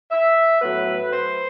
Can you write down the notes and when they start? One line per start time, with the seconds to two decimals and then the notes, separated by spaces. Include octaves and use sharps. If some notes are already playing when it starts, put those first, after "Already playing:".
0.10 E5
0.61 A2 F#3 B3 B4
1.12 C5